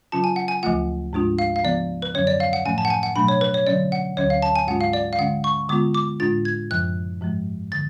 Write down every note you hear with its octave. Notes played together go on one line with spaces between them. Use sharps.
C#3 F#3 C#4 F4 A5
G#5
F#5
G#5
D2 C#3 F3 A3 F4 F#5
G#2 G#3 D4 F4
F5
F5
C#3 F3 B3 D5
B4
F#2 D3 F#3 C#4 C#5
D5
F5
F#5
A2 F3 A3 C#4 G#5
A5
F#5
G#5
F#5
B2 F#3 A3 D4 B5
C#5
B4
C#5
D3 F#3 C#4 D5
F#5
D2 D3 F#3 C#4 C#5
F5
A5
G#5
G#2 G#3 C#4 F4 F#5
F5
D5
F5
D3 G#3 C#4 F#5
C#6
D3 G#3 B3 F4 D6
D6
A2 G#3 D4 F4 A6
G#6
F#2 C#3 F3 F#6
G#2 F3 G#3
D3 A6